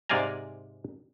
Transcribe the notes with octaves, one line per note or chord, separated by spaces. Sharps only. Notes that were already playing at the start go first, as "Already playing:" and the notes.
G#2 C3 D5 F5 G#5 A#5